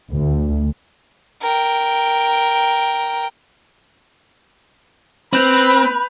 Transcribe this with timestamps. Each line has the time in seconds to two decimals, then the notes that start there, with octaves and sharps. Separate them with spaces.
0.13 D2
1.42 A#4 G5
5.33 C4 B4 B5 G6 F7